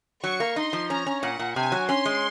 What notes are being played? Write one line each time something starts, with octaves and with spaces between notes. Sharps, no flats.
F#3 C#6
A#3
D#4 C6
F3
C#4 A#5
C#4
A#2 F#5
A#2
C3 G#5
F#3
C#4 C6
G#3